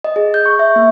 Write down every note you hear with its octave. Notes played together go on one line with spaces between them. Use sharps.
D#5
G#4
G6
C#6
E5
A#3